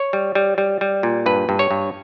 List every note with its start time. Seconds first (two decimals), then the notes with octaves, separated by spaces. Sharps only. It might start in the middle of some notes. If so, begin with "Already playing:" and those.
Already playing: C#5
0.13 G3
0.35 G3
0.58 G3
0.81 G3
1.03 A#2
1.26 G2 B4
1.49 G2
1.59 C#5
1.71 G2